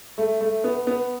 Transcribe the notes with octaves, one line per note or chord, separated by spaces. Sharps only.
A3
A3
B3
B3